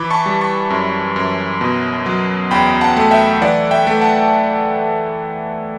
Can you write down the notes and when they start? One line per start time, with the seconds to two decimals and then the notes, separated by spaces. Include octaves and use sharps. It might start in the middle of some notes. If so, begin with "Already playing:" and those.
Already playing: E3 B5 D6
0.10 A5 C#6
0.26 G3
0.41 A5 C#6
0.70 F#2
1.16 F#2
1.61 B2
2.06 F#3
2.51 E2 G5 B5
2.81 F#5 A5
2.97 A3
3.11 E5 G5
3.41 E3 D5 F#5
3.71 E5 G5
3.87 A3
4.01 F#5 A5